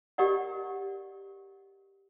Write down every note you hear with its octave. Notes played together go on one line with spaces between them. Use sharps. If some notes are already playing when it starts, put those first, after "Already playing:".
G4 A#4 D5 D#5 F#5